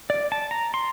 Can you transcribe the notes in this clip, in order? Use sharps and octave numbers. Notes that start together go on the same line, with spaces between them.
D5
A5
A#5
C6